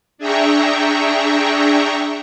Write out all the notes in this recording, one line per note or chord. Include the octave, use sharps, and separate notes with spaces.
D4 G#4 E5 G5 A#5 C#6